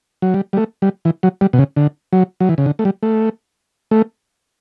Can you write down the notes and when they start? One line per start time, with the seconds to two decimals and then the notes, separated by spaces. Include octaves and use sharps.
0.22 F#3
0.34 G3
0.53 G3
0.57 A3
0.82 G3
1.05 E3
1.23 F#3
1.41 G3
1.53 B2
1.59 C#3
1.76 D3
2.13 F#3
2.40 F#3
2.49 E3
2.58 C#3
2.66 D3
2.79 A3
2.85 G3
3.03 A3
3.91 A3